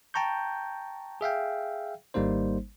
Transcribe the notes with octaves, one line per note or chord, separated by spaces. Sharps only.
G5 A5 A#5 C#6 G6
G#4 E5 F5 G5
G#1 G3 A#3 D#4 C5